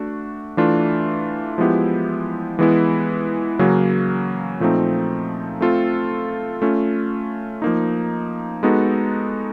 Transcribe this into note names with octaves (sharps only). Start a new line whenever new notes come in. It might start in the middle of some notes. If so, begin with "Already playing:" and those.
Already playing: A3 D4 F#4
E3 A3 D4 F4
F3 G#3 B3 E4 G4
E3 G#3 B3 E4
C#3 F#3 A#3 C#4 F#4
A#2 F3 A3 C4 D#4
A3 C4 F4 A4
A3 C#4 F4
F3 A#3 D#4
G#3 B3 D#4 F#4 A4